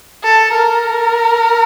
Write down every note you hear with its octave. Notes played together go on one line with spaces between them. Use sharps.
A4
A#4